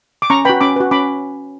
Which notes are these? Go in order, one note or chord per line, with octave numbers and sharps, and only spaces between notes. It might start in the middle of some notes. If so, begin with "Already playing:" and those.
D6
C#4 A#5 C#6
F#4 B4 G5 B5
C#4 B5 D6
F#4 B4
C#4 B5 D6